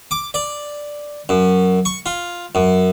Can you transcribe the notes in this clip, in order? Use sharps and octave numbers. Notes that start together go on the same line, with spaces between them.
D6
D5
F#2
C#6
F4
F#2